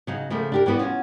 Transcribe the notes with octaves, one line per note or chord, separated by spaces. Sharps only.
C#3 F#3 D#4
C#3 F3 A3 A#3
D4 G4 A#4
E3 G3 B3 F#4 D5
C#4 F4 F#4